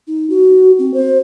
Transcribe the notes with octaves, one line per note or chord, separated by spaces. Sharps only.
D#4
F#4
C4
C5